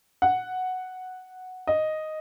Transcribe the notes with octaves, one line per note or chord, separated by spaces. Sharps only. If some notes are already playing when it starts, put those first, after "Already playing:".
F#5
D#5